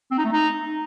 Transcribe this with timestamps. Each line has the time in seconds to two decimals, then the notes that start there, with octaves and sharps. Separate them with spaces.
0.11 C4
0.18 D#4
0.25 A3
0.32 D#4